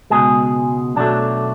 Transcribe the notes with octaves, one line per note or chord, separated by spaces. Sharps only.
C#2 B2 G#3 G#4
B1 B2 F#3 A3 D4